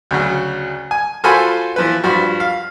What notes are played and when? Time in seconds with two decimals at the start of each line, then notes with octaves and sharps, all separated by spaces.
0.11 D2 C#3 F#3
0.91 G#5
1.24 F4 F#4 A4 C5 G#5 B5
1.76 E3 F3 B4
2.04 G2 F3 F#4
2.40 F5